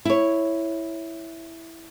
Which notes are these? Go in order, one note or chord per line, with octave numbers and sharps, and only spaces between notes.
E4 C#5